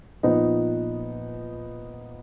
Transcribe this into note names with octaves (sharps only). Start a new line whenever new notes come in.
A#2 F3 B3 D#4